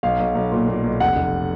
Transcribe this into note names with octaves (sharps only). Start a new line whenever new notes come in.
B1 F5
B1
B1
A#2
A#2
B1
F1 F#5
F1